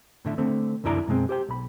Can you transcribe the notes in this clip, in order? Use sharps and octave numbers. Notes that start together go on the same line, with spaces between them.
A2 D3 E5
D3 A3 C4
C2 F#2 D3 E4 D5 A#5
F#2 B2 G#3 C4
G4 C5 G5
B1 B5